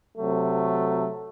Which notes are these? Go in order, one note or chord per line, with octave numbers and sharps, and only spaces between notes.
C3 F#3 A3